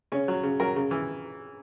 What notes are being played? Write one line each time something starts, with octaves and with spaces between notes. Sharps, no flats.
C#3 C#4
F#3
C#3
F#3 A#4
C#3
E3